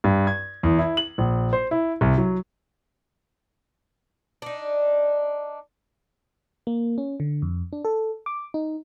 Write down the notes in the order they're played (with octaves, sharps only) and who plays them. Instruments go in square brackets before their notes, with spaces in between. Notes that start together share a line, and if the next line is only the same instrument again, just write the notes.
[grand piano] G2
G#6
E2
E4
F#7
A#1
C5
E4
C2
F#3
[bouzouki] D4 D#4
[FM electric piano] A#3
C#4
D3
F2
D4
A4
D6
D#4